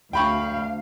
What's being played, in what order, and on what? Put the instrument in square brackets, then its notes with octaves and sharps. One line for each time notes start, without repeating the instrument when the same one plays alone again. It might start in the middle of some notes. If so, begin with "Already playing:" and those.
[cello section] D2 F5 [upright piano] G5 B5 C#6